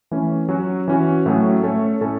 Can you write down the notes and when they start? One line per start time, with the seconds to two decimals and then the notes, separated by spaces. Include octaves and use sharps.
0.11 E3 A3 C#4
0.49 F#3 C#4 F#4
0.88 E3 C#4 F#4
1.26 A2 F#3 A3 C#4
1.63 A3 C#4 A4 C#5
2.01 A2 A3 C#4 A4 C#5